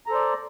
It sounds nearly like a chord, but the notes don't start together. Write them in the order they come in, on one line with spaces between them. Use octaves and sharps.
A#5 A4 C5 D5